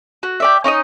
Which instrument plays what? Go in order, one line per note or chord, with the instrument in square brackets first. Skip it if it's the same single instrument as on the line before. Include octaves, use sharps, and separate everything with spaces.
[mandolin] F#4
G4 D5 E5
C#4 D#4 D5 D#5